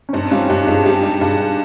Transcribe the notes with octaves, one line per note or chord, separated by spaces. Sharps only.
C#4
G2 C4 D#4
G3 C#4 F4
G2 D#4 G4
G2 F4 G#4
G3 D#4 G4
G3
G2 F4 G#4